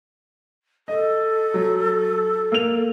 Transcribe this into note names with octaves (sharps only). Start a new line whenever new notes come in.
A4 D#5
F#3
A#3 F7